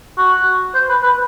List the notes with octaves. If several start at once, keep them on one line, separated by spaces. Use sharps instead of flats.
F#4
C5
B4
B4